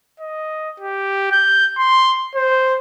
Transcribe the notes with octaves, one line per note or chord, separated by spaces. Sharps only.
D#5
G4
G6
C6
C5